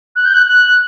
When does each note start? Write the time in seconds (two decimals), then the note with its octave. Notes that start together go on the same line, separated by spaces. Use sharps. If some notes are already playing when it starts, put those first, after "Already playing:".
0.16 F#6
0.25 G6
0.34 F#6
0.46 F#6